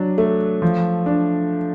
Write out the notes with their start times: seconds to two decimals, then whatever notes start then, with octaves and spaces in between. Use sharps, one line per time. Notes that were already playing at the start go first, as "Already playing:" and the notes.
Already playing: F#3 D4
0.18 A3
0.62 F3
1.06 D4